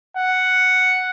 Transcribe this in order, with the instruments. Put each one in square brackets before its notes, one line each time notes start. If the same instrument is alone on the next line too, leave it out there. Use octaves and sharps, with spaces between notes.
[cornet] F#5